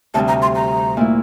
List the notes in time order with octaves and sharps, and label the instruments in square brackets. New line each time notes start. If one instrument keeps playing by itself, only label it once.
[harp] D2 C3 G3 [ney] A5
[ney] A#5
C6
A#5
[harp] A#2 A3 E4